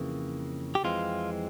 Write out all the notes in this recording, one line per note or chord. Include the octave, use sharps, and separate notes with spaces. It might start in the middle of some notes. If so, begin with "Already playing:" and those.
Already playing: F2 C#3 E3 A#3
G4
F2 E3 G#3 C4 F4